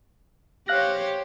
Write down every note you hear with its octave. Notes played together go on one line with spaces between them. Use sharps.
G4 C5 C#5 F5 F#6 A#6